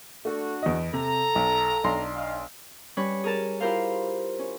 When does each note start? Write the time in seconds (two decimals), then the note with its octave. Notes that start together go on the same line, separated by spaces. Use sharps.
0.25 A3 D4 F#4
0.63 E2 D#5
0.94 C3 A4 A#5
1.35 B1
1.84 B1 D4 C6
2.15 D#4 F5
2.97 G3 C#4 B4 C#5
3.24 G#4 A#4 A5
3.60 E4 F4 G4 A#4 C5 F5
4.39 C#4